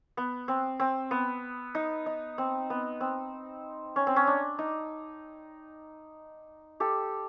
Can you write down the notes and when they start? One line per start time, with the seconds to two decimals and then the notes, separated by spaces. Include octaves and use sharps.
0.17 B3
0.48 C4
0.80 C4
1.11 B3
1.75 D#4
2.06 D#4
2.38 C4
2.70 B3
3.01 C4
3.96 C#4
4.07 C4
4.16 C#4
4.27 D4
4.59 D#4
6.80 G4 A4